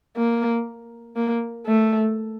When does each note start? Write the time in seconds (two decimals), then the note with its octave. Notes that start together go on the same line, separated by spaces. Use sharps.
0.17 A#3
1.16 A#3
1.67 A3